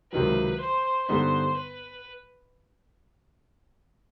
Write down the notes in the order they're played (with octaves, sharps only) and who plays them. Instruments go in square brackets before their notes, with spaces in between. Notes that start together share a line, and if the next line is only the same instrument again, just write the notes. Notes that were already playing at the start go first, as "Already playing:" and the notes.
[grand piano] C#2 C3 D#3 F#3 [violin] B4
[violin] C5
[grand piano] G2 D3 G3 B3 D#4 [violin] C5
[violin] B4